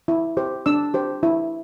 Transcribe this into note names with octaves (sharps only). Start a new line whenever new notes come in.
E4
G4 C5
D4 E6
G4 C5
E4